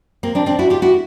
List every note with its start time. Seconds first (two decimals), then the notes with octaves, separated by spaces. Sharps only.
0.23 A#3 C4
0.35 C4 D4
0.46 C4 D4
0.59 E4 F#4
0.70 F4 G4
0.82 E4 F#4